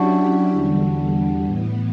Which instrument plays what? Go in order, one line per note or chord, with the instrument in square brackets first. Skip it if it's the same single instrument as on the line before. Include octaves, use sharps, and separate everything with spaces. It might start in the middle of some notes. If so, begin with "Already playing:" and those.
Already playing: [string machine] F#3 C#4 E4 G4 [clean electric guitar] D4 F#4
[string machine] E2 D3 G3
A2 E3 B3